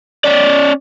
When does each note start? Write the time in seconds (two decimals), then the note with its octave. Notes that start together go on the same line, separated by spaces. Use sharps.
0.24 C#4 D5